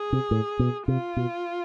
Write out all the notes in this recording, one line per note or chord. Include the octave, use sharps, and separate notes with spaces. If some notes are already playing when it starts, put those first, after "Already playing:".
Already playing: G#4
C3
A2
B2
C3 F4
B2